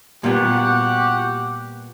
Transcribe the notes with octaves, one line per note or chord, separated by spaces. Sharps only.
A#2 G3 B3 F#4 G4 F#5